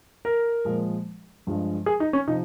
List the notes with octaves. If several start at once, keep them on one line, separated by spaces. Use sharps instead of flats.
A#4
A#2 F3 G#3
G2 F3 G#3
G#4
D#4
C#4
C3 F3 D#4